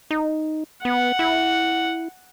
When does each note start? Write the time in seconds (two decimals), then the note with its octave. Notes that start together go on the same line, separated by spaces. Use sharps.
0.11 D#4
0.85 B3 F#5
1.19 E4